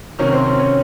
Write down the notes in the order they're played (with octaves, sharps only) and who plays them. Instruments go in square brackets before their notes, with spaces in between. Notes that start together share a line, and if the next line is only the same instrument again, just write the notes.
[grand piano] C3 D#3 F#3 [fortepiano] C#4
[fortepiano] C4
C#4
C#4